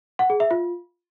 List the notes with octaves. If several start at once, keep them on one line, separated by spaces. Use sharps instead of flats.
F#5
G#4
E5
F4